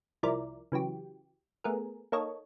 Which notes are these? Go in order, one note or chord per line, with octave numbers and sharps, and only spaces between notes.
C2 F3 E4 A#4 D5
C#3 E3 F#3 G4
A3 B3 G#4 A#4
A#3 D#4 A4 C#5 D#5